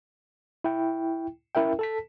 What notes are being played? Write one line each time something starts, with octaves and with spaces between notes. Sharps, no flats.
E4 G5
C#4 E4 A#4 E5 G5
A4 A5 B6